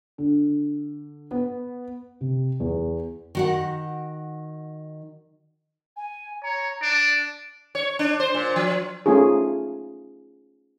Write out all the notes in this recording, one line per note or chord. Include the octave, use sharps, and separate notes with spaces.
D3
B3
C3
E2
D#3 F#4 F#5
G#5
C#5 A#5
D4 D7
C#5
D4
C5
A#2
F3
A3 C#4 D#4 F4 G#4